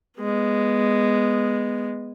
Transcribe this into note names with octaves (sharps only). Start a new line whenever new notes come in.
G#3 B3